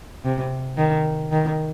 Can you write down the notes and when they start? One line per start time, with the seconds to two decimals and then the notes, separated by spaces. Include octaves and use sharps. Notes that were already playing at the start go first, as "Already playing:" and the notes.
0.24 C3
0.77 D#3
1.31 D#3